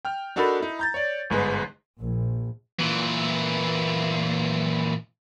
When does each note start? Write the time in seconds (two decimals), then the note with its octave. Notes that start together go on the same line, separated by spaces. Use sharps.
0.05 G5 F6
0.36 D4 D#4 F#4 A4 A#4 B5
0.60 D#4 E4
0.79 A#5 G6 A6
0.94 C#5 D5
1.30 G1 G#2 G#3 B4
2.00 A#1
2.79 A#2 E3